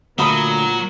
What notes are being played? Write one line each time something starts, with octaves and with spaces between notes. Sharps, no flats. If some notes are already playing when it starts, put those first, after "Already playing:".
D2 A#2 F#3 A#4 B5 D#6